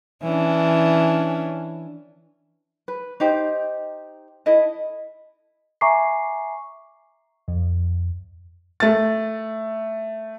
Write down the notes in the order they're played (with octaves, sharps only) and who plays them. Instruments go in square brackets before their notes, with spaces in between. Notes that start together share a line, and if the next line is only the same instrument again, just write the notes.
[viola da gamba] E3 C#4 D4
[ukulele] B4
D#4 G4 C5
E4 A4 D#5
[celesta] E5 G#5 A#5 C#6 D6 C7
[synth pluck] F2
[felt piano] A3 A6